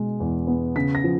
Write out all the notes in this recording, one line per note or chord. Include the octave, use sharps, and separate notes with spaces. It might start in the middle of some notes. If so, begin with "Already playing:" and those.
Already playing: B2 G#3
E2
B3
C#3 B6
A#6
F3